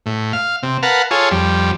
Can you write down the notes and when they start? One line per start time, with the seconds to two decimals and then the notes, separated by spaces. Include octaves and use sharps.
0.06 A2
0.33 F5
0.63 C3
0.83 A#4 B4 F5 F#5 A5
1.11 F4 G#4 A4 C#5
1.31 F2 G3